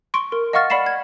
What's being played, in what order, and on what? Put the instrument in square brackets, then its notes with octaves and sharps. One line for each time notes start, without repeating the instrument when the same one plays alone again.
[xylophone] C6 C#6 D7
A#4
D#5 F5 F#5 C#6 F6 A6
D5 F#5 B5 B6 C7 E7
G#6